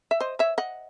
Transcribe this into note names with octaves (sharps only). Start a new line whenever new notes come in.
E5
C5 D#5
C#5 E5
D#5 F#5